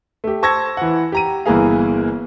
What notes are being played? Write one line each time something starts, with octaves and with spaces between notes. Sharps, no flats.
A3 G4
C5 A5 C#6 E6 G#6 A#6
E3 F#5
G4 A#5 D#7
G1 E3 A#3 G#4 F5